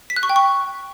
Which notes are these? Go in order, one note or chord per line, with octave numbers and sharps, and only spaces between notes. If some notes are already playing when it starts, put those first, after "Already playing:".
B6
F#6
C#6
G5
C#6